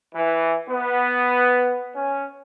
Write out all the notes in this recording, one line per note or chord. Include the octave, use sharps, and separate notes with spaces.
E3
B3
C#4